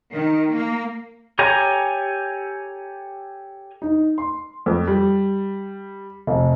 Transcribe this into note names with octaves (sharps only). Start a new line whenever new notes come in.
D#3
A#3
G4 A4 C#5 G#5 A#5
D#4
C6
F2
G3
F1